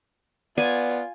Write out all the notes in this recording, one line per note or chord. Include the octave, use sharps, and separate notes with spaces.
B3 F4 D5 G#5